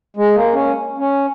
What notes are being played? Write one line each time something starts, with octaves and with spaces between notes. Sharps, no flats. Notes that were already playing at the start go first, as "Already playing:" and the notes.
G#3
A#3
C#4
C#4